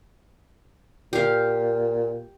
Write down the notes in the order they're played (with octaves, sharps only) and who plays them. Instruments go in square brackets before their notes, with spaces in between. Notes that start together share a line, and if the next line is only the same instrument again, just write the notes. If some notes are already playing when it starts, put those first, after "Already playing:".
[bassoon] A#2 [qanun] G4 F5